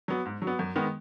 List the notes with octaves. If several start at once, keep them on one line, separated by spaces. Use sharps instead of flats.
F#3 B3
G#2
F#3
B3
F#2
D#3 G#3 B3